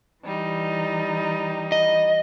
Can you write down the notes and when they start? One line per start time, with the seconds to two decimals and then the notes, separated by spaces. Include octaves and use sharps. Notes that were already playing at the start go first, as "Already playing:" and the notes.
0.23 E3 G3 D#4
1.72 D#5